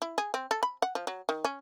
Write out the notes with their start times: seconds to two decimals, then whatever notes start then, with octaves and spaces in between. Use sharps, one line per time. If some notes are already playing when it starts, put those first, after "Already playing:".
0.02 E4
0.18 G#4
0.34 C4
0.51 A4
0.63 B5
0.82 F#5
0.95 F3
1.07 F#3
1.29 D#3
1.45 C#4